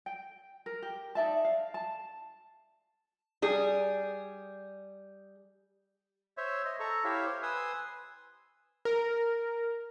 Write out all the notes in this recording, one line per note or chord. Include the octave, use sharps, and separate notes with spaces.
G5
A#4
G4
D#4 D5 E5 A5
F5
A5
G3 G#4
C5 C#5 E5
C5 D#5
A4 A#5 C#6
E4 G4 C#5 E5 F5
C5
B4 G#5 C6 D#6 E6
A#4